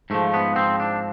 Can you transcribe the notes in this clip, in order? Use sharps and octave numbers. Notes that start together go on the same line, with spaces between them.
G#2 F3 A3
B3
C4
D4